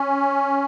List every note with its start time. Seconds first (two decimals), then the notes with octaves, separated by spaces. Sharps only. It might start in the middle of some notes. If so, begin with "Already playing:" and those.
Already playing: C#4